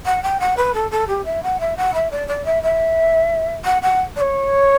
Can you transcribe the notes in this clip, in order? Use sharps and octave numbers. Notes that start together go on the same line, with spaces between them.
F#5
G5
F#5
B4
A4
A4
G4
E5
F#5
E5
F#5
E5
D5
D5
E5
E5
F#5
F#5
D5
C#5